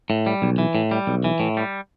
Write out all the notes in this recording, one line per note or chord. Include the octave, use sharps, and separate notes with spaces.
A2
G3
B1
E3
A2
G3
B1
E3
A2
G3